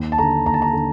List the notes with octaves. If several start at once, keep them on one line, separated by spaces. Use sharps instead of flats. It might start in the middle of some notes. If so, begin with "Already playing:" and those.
Already playing: D#2
A5
D3 A#5
D#2 A#5
A5
A#5
D3